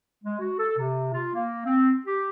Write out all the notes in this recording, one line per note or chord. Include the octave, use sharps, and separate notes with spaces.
G#3
F#4
A4
C3
F4
A#3
C4
G4